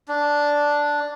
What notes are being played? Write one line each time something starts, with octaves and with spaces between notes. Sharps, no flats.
D4